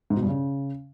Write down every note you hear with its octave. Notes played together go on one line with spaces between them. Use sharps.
G#2
B2
G2
C#3